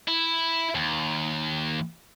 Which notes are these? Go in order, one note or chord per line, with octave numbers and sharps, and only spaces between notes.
E4
D#2